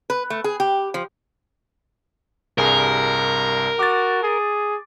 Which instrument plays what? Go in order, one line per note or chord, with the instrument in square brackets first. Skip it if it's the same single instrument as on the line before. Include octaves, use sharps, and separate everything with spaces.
[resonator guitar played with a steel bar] B4
A3
G#4
G4
F3
[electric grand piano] C2 G2 G#4 [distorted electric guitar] A#4
[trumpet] F#4 [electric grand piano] D6 A6
[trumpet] G#4